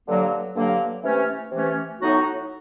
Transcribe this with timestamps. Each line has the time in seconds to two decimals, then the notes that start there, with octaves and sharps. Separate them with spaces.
0.08 G2 D3 F#3 A#3
0.56 G2 D3 F#3 A#3
1.04 C3 E3 A3 C#4
1.52 C3 E3 A3 C#4
2.00 A2 F#3 B3 D#4 F#4